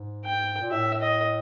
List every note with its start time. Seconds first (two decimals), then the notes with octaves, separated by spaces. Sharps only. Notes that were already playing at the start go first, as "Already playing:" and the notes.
Already playing: G#2
0.26 G5
0.60 A#2
0.71 A2 E5
1.02 D#5